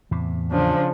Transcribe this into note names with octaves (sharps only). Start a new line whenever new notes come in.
E2 A2 C3
C#3 F3 D4